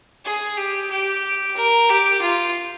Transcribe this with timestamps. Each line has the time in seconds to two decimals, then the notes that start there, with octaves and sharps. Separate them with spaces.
0.25 G#4
0.57 G4
0.90 G4
1.56 A#4
1.89 G4
2.22 F4